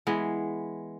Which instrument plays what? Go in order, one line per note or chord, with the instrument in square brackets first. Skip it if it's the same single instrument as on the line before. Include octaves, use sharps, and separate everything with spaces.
[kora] E3 G#3 B3